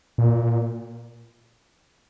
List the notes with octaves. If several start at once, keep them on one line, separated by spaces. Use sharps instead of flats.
A#2